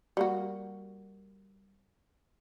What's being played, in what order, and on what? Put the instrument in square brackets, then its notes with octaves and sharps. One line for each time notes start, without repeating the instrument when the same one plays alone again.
[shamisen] G3 A#3 F#4